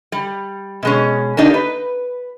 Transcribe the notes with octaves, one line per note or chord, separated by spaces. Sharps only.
G3
B2 G#3 C#4
A#3 D4 D#4 G4
B4